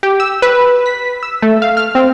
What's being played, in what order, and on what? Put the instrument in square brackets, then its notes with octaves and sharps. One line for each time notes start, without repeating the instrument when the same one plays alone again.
[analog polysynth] G4
E6
B4
B6
E6
A3
F5
F6
C4